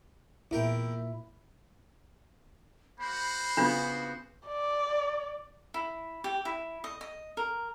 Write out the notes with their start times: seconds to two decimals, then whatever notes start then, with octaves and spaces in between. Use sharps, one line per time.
0.51 E2 A#2 E4 A#4 G5
2.99 A#3 F#4 C5 B5
3.57 C#3 B3 D4 F4
4.47 D5
5.74 E4
6.24 G4
6.45 E4
6.84 D#5
7.01 D#5
7.37 A#4